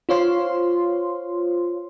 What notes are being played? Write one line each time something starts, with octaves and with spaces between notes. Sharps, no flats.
F4 C5 C#5 F5 C6